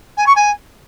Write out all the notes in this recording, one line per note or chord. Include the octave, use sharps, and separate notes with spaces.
G#5
C#6
G#5